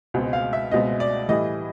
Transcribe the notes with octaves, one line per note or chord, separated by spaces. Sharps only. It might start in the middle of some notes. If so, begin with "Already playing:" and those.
C#2 B2 G#3 C4
F5
E5
C#2 B2 G#3 C4 D#5
D5
A2 E3 G3 D#5